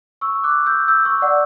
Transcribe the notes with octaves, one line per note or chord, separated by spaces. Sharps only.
C#6 E6
D6 F#6
E6 G6
E6 G6
C#6 E6
D5 F#5